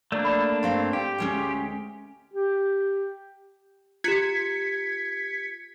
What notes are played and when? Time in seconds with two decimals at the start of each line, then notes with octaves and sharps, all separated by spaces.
0.12 A3 A#3 D4 D5
0.25 D5 B5
0.63 G2 C4 F5
0.93 G4 G5
1.18 D2 G#3 C#4
2.33 G4
4.04 F4 G4 G#6 B6 C#7